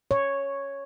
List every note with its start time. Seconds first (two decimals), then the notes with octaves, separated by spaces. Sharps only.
0.11 C#5